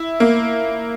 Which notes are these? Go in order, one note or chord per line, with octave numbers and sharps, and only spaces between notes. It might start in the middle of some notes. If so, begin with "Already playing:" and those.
Already playing: E4
A#3